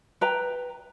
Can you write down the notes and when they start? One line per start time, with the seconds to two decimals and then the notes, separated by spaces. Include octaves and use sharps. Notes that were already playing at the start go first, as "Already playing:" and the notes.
0.21 B4 G5 A#5